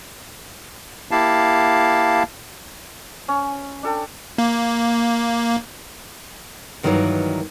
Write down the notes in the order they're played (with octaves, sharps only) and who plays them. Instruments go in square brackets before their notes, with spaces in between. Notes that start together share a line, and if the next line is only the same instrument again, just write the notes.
[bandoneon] A#3 E4 G4 F5 A5
[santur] C#4
D4 A4 G5
[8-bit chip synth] A#3
[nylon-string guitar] G2 D#3 E3 F#3 G3 A#3